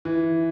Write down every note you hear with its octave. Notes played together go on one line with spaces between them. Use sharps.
E3